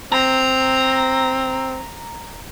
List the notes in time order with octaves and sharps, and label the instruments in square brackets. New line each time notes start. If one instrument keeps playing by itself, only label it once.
[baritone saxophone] C4 [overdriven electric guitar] A#5